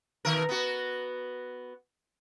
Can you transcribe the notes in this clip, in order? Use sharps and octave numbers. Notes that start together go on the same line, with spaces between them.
B2 D#3 A#4
B3 F#4